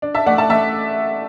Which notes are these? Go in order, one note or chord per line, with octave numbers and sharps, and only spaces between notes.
D4
E5 A5
A3 D5 F#5
E5 A5
A3 E5 A5